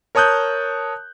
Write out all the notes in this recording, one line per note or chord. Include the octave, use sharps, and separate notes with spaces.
A#4 C#5 A5 D#6 F#6 G6